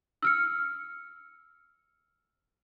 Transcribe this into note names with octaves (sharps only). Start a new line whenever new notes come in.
E6 F6 C#7